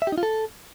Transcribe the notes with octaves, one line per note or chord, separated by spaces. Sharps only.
E5
G4
D#4
F4
A4